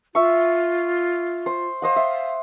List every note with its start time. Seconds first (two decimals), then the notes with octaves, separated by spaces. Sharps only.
0.15 F4 E5 C#6
1.46 C5
1.82 C5 D#5 F5 F#5
1.96 E5